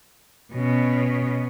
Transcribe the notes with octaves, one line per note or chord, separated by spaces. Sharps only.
B2 C#4